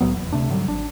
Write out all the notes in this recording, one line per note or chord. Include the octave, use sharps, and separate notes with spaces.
C2 A2 F#3 B3
F1 E2
D2 C3 A3 D4
G#2 D3 F#3 G3
G#1 D4